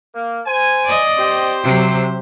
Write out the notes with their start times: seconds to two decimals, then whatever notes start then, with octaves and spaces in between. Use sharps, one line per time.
0.14 A#3
0.45 C5 G#5
0.84 D5 D#5
1.16 C4 G4 C5
1.63 C3 F#3